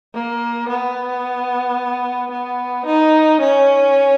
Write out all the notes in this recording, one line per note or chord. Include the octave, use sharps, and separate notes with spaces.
A#3
B3
B3
D#4
C#4